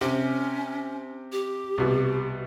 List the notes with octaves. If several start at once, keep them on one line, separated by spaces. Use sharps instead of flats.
C3 C#4
G4
C2 B2